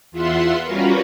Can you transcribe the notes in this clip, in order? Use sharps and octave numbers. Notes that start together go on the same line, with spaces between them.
E2 F4 E5 F#5 C6
G3 C#4 F4 F#4 A#4 B4